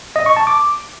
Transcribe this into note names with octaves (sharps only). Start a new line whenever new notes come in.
D#5
C#6
A5
D6